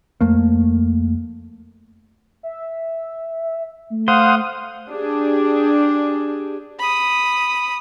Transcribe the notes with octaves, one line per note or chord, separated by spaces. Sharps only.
F2 A3 A#3
E5
A3
C5 F5 F#5 D#6
D4 G4 G#4
B5 D#6